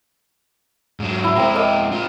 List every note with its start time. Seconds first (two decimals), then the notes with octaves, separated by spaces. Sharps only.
1.00 G#2 F#3
1.24 E4
1.35 G#3 C4 E4 G5 A#5
1.55 A#3 D#5 E6
1.92 D4 F4